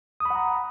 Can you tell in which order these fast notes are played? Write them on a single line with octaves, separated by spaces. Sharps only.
D#6 B5 F#5 A#5